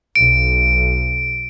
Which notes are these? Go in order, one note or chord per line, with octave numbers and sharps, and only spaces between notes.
B1 D7